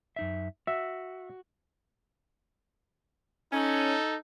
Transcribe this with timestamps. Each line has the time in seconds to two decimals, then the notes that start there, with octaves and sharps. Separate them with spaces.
0.16 F#2 D#4 E5
0.67 F#4 E5
3.53 C#4 D#4 A4